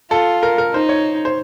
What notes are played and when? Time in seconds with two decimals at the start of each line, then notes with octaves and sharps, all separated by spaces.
0.11 F4 A4
0.43 A#4
0.58 A#4
0.74 D#4 C5
0.89 C#5
1.25 C5